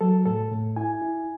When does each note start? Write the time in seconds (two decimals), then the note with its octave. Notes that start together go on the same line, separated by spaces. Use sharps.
0.01 F#3 A4
0.26 A2 A4
0.51 A2
0.76 E4 G#5
1.02 E4